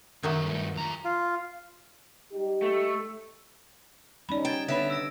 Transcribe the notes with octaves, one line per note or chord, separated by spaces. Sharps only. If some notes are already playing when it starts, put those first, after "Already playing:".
F#2 D#3 F#3 A#3 A4 E5
G2 A3
F2 A#5
F4
G3 D#4 G4
A3
G3 C#4 D#4 D5 B5
G5 G#6 A6 E7
D3 B3 C#5 E5 B5 D7
E6 A#6 D7